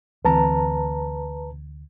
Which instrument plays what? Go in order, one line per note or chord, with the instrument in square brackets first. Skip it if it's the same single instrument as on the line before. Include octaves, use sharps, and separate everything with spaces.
[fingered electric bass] D2 E3 C4 [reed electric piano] B4 A5 A#5